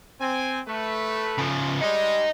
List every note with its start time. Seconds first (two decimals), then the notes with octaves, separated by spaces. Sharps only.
0.20 C4 G#5
0.67 A3 B4
1.39 C#3 F3
1.82 G3 G#3 D#4 D#5